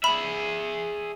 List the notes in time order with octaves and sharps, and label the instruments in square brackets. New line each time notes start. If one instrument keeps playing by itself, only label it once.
[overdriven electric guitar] G#4 E5 [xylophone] B5